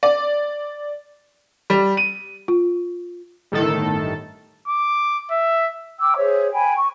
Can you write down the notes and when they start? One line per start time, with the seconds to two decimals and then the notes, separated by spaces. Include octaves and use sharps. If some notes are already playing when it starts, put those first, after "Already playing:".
0.03 D5
1.70 G3
1.97 D#7
2.48 F4
3.52 G1 A2 D#3 A4
4.68 D6
5.31 E5
6.00 G5 D6 E6
6.17 G#4 C5 C#5 E5
6.51 G5 G#5 B5
6.76 C#6